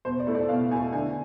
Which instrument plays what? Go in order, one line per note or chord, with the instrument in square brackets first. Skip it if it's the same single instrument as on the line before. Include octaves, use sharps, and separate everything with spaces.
[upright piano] B2 C5
D5
A3 E4
D5
B2 F5
E4 G#5
A3
D3 G#5